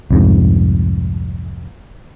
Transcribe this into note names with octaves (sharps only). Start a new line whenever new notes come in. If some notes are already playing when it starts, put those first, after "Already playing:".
C2 F2 G#2